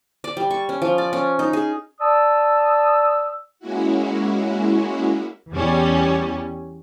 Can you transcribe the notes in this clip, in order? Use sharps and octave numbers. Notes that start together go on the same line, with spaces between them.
D5
G3
C#6
C#4
F3
D5
C#4
D#4
G#4
D5 A5 D#6 E6
G#3 A#3 C#4 E4 F#4
E2 G3 C#4